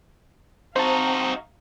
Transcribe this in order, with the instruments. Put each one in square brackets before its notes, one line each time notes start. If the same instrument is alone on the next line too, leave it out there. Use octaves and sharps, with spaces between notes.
[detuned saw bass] C4 [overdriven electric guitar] D#4 F#4 [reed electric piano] C5 A5 [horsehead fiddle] F5 A#5